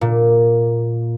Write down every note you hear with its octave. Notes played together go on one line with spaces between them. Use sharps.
A#2